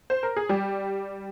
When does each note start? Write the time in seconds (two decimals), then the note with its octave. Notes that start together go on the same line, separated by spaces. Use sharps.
0.10 C5
0.23 A#4
0.36 G#4
0.49 G3 G4